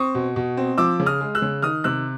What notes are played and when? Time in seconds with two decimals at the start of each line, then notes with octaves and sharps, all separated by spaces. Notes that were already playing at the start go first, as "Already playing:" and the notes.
Already playing: C4 C#6 D#6
0.15 B2
0.36 B2
0.57 C4
0.78 F3 D6 E6
1.00 C#3
1.06 D#6 F6
1.21 G#3
1.35 E6 F#6
1.42 C#3
1.62 D#3 D#6 F6
1.84 C3 E6 F#6